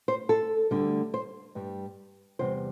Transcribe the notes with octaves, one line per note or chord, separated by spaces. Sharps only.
C5
A4
D2 D3 G3
C5
G2 G3
E2 C3 G3 C5